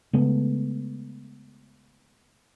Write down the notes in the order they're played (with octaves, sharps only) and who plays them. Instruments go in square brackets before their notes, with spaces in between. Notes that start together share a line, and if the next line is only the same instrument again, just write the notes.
[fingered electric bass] C#3 G#3 A3 B3